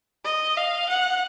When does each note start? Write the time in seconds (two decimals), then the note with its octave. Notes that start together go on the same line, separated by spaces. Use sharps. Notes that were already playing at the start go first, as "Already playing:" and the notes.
0.25 D#5
0.57 F5
0.90 F#5